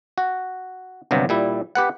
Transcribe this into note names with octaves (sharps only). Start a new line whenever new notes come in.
F#4
G1 G2 C3 F#3
A#2 G3 E4
G4 B4 F#5